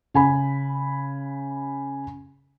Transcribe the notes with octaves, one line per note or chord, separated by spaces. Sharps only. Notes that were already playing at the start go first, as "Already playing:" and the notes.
C#3 G#5 B5